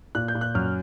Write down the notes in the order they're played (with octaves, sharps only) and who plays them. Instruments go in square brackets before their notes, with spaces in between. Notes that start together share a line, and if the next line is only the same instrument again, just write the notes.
[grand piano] A#2 F#6
G6
A#2
F#6
F#2 F6